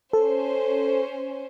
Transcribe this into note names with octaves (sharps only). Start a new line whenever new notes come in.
C#4 A4 C5